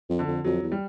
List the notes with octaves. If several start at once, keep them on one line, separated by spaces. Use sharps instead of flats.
F2
D3
F2
F2 F#3
E2
G3